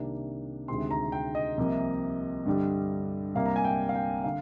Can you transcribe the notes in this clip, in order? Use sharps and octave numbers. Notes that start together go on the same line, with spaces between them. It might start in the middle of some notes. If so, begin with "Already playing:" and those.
Already playing: C2 C3 D#3 A#3 D4
D2 C3 D#3 G#3 C4 C6
A#5
G5
D#5
C2 C3 F3 A#3
G2 D3 G3
C2 C3 G3 A#3 D4 F5
A#5
G#5
G5
F5
G5
D3 F5